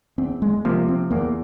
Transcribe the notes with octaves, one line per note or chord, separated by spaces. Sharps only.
E2 C4
G#3
C3 F3 A#3
C4
E2 A#3